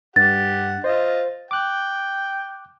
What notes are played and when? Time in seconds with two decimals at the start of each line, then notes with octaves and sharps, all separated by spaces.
0.16 G2 G4 F#5 A6
0.84 F4 C5 D#5
1.51 G5 D6 F#6